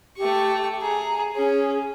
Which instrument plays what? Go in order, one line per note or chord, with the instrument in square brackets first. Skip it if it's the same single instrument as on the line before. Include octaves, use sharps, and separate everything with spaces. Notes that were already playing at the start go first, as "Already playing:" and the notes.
[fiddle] A3 C#6 [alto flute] G4
[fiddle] G#4 [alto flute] A#5
[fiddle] C#4 [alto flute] G#4